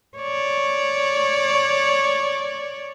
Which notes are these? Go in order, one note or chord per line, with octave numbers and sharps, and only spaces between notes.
C#5 D5